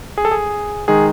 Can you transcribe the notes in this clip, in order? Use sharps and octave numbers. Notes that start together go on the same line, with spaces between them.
G#4
A4
G#4
D#3 G#3 D#4 G#4